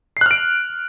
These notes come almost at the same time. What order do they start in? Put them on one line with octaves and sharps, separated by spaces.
C7 F#6 F6 D7